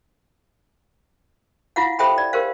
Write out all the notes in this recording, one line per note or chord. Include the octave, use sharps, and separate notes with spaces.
E4 F4 F5 F#5
G4 A4 C5 E5 G5 B5
D5
G4 A#4 C5 F5